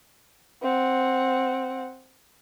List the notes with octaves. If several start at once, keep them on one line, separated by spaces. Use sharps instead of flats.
C4 F#5